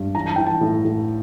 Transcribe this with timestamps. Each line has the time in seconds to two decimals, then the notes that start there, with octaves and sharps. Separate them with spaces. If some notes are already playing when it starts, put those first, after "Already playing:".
Already playing: G2
0.15 E3 A#5
0.26 A5
0.36 E3 G5
0.46 A5
0.61 A2
0.85 A2